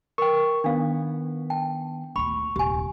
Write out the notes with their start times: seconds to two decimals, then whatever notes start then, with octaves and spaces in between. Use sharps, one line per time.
0.18 A#4 B4 G5 C#6
0.64 D#3 B3 D4 F5
1.50 G5 A5
2.16 D2 A#2 B5 C#6
2.56 D#1 C2 G4 G#5